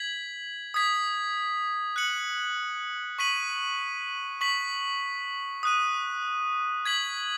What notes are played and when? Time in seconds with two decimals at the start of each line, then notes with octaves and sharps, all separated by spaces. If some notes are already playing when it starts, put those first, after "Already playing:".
Already playing: G#6 B6 F#7
0.74 D#6 G#6 B6
1.96 F#6 C#7 F#7
3.19 C#6 B6 D#7 F#7
4.41 C#6 B6 F#7
5.63 D#6 F#6 D#7
6.85 G#6 B6 F#7